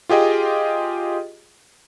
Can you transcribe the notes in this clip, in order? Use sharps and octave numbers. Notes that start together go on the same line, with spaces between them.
F4 G4 G#4 D#5 G5